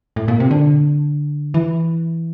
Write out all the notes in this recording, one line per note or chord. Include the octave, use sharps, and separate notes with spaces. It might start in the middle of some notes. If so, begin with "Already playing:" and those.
A2
A#2
C3
D3
E3